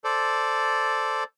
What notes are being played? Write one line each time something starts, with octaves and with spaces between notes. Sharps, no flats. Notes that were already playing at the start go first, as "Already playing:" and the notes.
A4 C5 D5